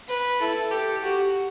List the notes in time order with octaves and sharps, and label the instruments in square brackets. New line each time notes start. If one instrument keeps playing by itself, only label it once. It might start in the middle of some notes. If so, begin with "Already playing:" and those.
[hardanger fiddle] B4
[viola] E4 [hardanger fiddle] A4
[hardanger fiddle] G4 [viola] A4
[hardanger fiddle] F#4 [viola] G4